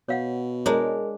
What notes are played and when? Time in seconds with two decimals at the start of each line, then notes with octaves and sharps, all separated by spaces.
0.09 B2 C#5 F5 F#5
0.66 G#3 D4 A#4 C#5